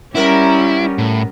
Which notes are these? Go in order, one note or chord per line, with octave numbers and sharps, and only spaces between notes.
G3 B3 C#4 E4 A#4
A2